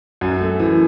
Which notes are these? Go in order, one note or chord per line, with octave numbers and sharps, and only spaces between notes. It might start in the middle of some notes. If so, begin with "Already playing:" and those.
F#2
A3
E3